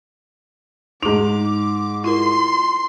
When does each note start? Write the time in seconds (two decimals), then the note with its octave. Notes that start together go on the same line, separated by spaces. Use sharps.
1.03 G#2 D#4 G#4 D6 F7
2.04 E4 F4 A#4 C6